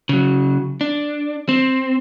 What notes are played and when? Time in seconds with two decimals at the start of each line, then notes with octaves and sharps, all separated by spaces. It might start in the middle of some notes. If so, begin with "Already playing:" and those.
0.09 C#3 F#3
0.81 D4
1.49 C4